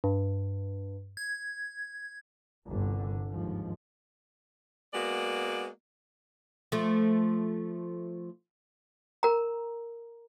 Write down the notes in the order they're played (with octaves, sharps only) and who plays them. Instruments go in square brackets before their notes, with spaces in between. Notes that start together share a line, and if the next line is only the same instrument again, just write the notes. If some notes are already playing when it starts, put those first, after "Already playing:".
[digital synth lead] G2
G#6
[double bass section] G1 C2 D3
D#2 G#2 F3
[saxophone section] G#3 A#3 B3 F#4 D5
[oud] F3 A3
[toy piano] A#4 A#5